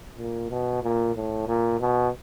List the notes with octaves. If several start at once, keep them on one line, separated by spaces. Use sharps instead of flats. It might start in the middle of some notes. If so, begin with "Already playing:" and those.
A#2
B2
A#2
A2
A#2
B2